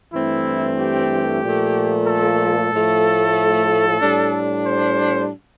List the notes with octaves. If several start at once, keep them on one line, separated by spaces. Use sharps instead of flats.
G2 E3 A3 C4 E4
G4
A#2 F3 A3
A4
A2 F3 A3
A2 G3 D4
C5